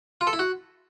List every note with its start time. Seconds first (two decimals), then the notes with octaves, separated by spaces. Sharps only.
0.21 F4
0.27 A4
0.33 E4
0.39 F#4